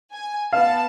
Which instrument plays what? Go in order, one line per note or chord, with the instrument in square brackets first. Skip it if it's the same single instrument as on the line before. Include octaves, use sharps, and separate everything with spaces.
[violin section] G#5
[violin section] B3 A5 [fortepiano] F5